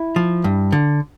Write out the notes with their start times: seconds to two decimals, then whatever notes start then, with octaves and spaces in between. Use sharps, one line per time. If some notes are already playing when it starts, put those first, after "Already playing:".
Already playing: E4
0.16 F3
0.44 G2
0.72 D3